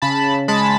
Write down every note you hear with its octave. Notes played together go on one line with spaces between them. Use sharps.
C#3 A5 B5
G#3 A5 B5